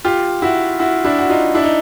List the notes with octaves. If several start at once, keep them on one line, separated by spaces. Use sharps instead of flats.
F4 G4
E4 F#4
E4 F#4
D4 E4
F#4
D#4 F4
D4 E4
D#4